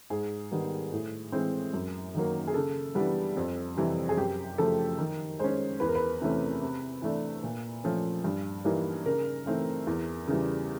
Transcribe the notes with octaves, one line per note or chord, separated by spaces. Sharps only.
G#2 G#4
D#3 G3 B3
A2
E3 G#3 C4
F#2
D#3 F#3 A#3
G#4
C#3 A4
E3 G3 B3 D4
F2
C3 E3 G3
G#4
F#2 G4
C#3 F3 A3 A4
D#3
G#3 C#4 C5
E2 B4
A#4
B4
C3 E3 A3 C#4
C3
E3 A3 D4
A#2
F3 A3 C#4
G2
E3 G3 A#3 D#4
C#3 A#4
E3 A3 C4 D#4
E2
C#3 E3 G3